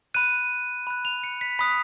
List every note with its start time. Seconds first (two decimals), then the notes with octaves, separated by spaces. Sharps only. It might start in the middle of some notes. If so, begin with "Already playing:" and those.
0.14 B5 F#6 D#7
0.87 B5 F#6
1.05 F7
1.24 C#7
1.41 B6
1.59 B5 D#6 F#6 B6